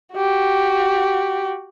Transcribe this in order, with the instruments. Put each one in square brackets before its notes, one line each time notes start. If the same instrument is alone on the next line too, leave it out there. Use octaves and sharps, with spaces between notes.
[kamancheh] F#4 G4